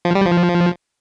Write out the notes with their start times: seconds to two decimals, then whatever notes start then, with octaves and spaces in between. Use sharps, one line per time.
0.05 F3
0.15 G3
0.26 F3